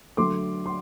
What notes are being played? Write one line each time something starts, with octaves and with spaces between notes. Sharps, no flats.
D3 F#3 A3 C6 D6
C6